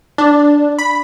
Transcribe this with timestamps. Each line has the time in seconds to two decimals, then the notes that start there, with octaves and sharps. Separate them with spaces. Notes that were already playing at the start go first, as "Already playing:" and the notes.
0.18 D4
0.79 B5